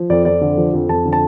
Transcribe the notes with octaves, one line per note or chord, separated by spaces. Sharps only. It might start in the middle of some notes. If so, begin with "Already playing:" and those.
Already playing: F3
F2 D5
F2 D5
D3
F3
F2
F2 A5
D3
A5